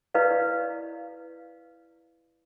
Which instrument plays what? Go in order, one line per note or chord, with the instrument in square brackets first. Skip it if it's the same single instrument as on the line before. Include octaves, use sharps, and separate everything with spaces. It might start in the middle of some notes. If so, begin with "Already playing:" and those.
[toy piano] E4 B4 D5 D#5 F5